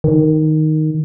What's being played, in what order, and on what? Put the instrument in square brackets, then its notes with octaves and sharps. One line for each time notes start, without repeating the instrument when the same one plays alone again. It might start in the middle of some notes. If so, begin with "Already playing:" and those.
[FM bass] D#3